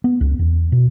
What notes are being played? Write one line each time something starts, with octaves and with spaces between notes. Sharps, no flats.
B3
C#2
E2
B2